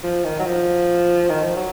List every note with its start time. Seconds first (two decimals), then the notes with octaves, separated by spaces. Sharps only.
0.04 F3
0.24 D#3
0.40 F#3
0.46 F3
1.30 D#3
1.43 F3
1.57 F#3